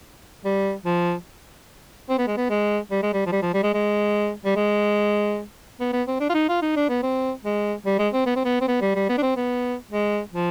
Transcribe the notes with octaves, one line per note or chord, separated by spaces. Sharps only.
G3
F3
C4
B3
G#3
B3
G#3
G3
G#3
G3
F3
G3
F3
G3
G#3
G#3
G3
G#3
B3
B3
C4
D4
F4
D#4
F4
D#4
D4
B3
C4
G#3
G3
G#3
C4
B3
C4
B3
C4
B3
G3
G3
B3
D4
C4
B3
G#3
F3